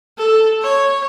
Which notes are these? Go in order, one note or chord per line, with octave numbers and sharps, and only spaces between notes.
A4
C#5